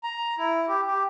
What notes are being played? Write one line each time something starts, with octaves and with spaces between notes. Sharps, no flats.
A#5
E4
G4
G4